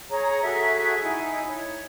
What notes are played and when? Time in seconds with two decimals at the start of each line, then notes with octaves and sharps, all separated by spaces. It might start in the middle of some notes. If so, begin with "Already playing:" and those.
0.10 G#4 C#5 A#5
0.43 F#4 G#4 A4 E5
1.03 D#4 E4 G#5
1.47 C#5